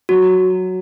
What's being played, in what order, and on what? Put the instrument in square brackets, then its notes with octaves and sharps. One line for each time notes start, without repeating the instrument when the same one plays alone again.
[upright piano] F#3 [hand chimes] F#4